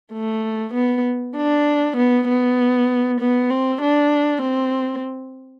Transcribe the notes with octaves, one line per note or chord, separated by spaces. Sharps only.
A3
B3
D4
B3
B3
B3
C4
D4
C4